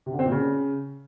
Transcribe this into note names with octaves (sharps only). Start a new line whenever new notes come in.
C3
D3
C4
A#2
C#3